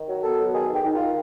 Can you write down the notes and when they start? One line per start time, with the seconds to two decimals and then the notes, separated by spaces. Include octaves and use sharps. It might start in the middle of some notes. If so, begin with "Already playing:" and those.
Already playing: D#3
0.08 F#3
0.23 B3 A4
0.39 F#3
0.54 D#3 G#4
0.69 D#3 G4
0.85 D#3
0.94 F4
1.00 D#3